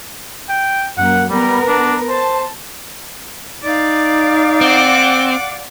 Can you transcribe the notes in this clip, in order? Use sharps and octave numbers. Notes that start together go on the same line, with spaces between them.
G5
F#2 A#3 F#5
G3 B3 A#4
D4
C5 A5
D#4 D5 F5
C4 F#5 D6